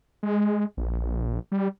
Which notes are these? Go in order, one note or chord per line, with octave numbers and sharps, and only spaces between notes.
G#3
A#1
G3